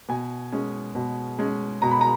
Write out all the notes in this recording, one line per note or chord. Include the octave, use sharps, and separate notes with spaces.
B2 G#5
G#3 C#4
B2
G#3 C#4
B2 A#5
B5
A#5